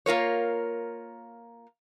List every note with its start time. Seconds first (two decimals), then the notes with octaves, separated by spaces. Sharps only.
0.06 A#3 F4 A#4 C#5